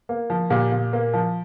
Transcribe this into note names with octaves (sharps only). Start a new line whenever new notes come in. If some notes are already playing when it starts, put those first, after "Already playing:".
A#3
F3
A#2 G4
A#2
A#3
F3